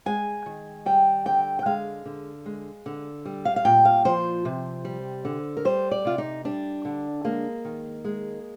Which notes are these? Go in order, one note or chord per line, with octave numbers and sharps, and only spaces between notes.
G#3 G#5
D#3
G3 G5
D3 G5
G5
G#3 F5
D3
G#3
D3
G3
F5
F5
A#2 G5
F5
F3 C5
C3
G3
D3
A#4
G3 C5
D5
C3 F4
D#4
G3 D4
D3
G#3 A#3
D#3
G#3